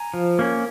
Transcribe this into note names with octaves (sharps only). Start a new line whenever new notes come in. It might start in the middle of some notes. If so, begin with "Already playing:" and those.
Already playing: G#5 A#5
F3
A#3 C#4